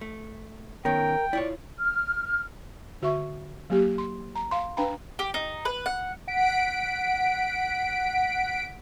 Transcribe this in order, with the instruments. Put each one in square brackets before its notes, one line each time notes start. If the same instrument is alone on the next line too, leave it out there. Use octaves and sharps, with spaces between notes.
[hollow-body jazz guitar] A3
[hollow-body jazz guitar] D#3 B3 C#4 [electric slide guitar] A#4 [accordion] G5
[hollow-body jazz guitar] E4 F4 C#5 [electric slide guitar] D5
[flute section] F6
[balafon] D3 F#4 E5 C#6
F#3 A#3 G4
C6
A#5
F5 C6
D4 B4 F5 G5 A#5 B5
[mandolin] G4
D#4
B4
F#5
[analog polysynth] F#5 B6 D7